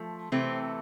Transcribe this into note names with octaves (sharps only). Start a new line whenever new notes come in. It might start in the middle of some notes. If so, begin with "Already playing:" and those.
Already playing: F3 A3
C3 E3 A3 C4